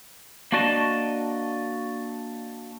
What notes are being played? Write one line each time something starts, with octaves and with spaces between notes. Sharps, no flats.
A#3 D4 F#4 D5 D#5 A5